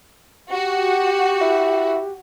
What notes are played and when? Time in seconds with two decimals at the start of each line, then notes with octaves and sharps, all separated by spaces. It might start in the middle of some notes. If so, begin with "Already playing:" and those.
0.51 F#4 G4
1.41 E4